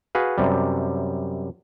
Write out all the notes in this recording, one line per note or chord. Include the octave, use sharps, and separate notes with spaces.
F#4 G#4 B4 F5
F#2 C3 G3